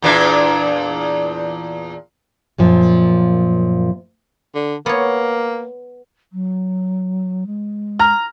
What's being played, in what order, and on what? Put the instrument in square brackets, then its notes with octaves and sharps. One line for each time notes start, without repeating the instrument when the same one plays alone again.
[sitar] E2 A#2 D4
[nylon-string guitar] F#2 A#2 F3
[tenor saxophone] D3
[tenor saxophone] A#3 [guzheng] B3 C#5
[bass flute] F#3
G#3
[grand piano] A#5 F6